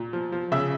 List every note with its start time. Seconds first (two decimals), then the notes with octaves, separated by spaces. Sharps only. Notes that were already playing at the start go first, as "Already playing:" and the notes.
Already playing: A#2
0.13 F3
0.32 F3
0.52 C#3 E5